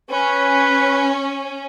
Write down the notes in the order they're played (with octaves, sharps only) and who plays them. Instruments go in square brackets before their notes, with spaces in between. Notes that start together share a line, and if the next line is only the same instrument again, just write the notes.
[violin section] C#4 [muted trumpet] B4